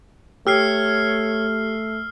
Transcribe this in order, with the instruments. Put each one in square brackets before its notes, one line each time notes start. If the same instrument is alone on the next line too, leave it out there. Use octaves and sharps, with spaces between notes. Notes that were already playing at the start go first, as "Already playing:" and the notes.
[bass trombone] A3 [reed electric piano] G4 [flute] C#5 [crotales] E6 F6 C7